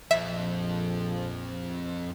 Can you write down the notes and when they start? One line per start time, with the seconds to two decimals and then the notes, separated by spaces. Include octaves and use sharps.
0.11 A#1 F2 F3 E5